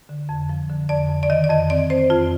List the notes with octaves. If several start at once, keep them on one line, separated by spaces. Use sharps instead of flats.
D3
F2
F3
D3
F2 D5
F2
D5
D#3 D#5
D5
F2 D#5
C4 D5
C4 C5
F2 F4